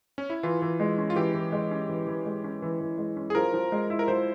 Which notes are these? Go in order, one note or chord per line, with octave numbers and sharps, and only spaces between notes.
C#4
E4
E3 F4
E3
G#3
C#4
F4
E3 G4
E3
G#3
C#4
E3
E3
G#3
C#4
E3
E3
G#3
C#4
G#4
F3 A#4
F3
G#3
E4
A#4
F3 C5